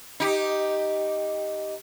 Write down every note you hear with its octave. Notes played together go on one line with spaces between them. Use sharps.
D#4 G4